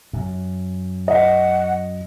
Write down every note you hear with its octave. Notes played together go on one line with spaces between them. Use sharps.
F#2
D#5 F#5